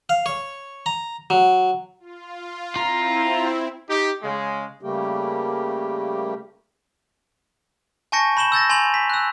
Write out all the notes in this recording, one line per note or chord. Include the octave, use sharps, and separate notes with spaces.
F5
C#5
A#5
F#3
F4
C4 E4 F4 A#5
D#4 G4
C#3 G#3
C#3 G3 A3 A#3 G4
G#5 A5 C#6 G6 A#6 C#7
B5 G6 E7 F#7 G7
E6 G6 A6 A#6
G#5 C6 F7 F#7
B6
E6 F#6